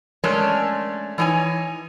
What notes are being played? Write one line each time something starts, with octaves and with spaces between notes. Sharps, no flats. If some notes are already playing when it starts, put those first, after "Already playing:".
G#3 A3 C#4 D4 A#4 C#5
E3 D4 D#4 C#5 G#5